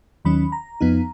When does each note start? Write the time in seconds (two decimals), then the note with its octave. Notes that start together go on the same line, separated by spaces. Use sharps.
0.25 D#2 D#3 F#3 C#4 B5
0.52 A#5
0.81 F2 F3 B3 D#4